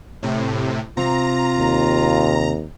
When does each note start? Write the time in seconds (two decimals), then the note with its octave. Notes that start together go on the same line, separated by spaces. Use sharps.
0.23 A2 C3
0.97 C3 C4 F4 A#5
1.58 D#2